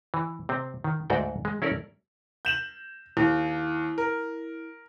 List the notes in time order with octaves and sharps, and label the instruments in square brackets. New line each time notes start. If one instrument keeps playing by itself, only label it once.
[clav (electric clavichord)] E3
C3 C4
D#3
D2 G#2 F#4 D5 G5
G#3
C#4 E4 A4 A#4 D5
[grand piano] G6 E7 F#7
[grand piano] D#2 [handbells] E4
[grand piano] A#4